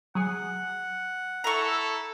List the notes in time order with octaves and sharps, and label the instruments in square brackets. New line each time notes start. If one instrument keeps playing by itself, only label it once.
[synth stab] F#3 G#4 [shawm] F#5
[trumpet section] E4 A4 [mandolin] A#5 C#6